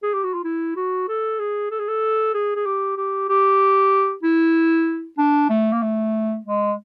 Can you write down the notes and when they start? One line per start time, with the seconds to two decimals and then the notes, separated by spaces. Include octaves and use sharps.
0.03 G#4
0.13 G4
0.24 F#4
0.34 F4
0.44 E4
0.76 F#4
1.08 A4
1.39 G#4
1.71 A4
1.79 G#4
1.88 A4
2.34 G#4
2.56 G#4
2.66 G4
2.97 G4
3.29 G4
4.23 E4
5.18 D4
5.49 A3
5.72 A#3
5.82 A3
6.45 G#3